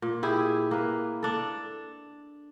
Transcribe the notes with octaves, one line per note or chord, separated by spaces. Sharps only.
A#2
E4 G4 G#4
A#3 B4
D4 A4